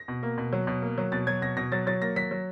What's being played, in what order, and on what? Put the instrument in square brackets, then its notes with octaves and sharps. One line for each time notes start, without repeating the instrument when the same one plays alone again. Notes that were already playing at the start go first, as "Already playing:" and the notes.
Already playing: [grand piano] A#6
B2
A#3
B2
F#3
B2
A#3
F#3
B2 A6
F#3 G#6
B2 A#6
B2 A#6
F#3 A6
F#3 A6
A#3 A#6
F#3 B6
F#3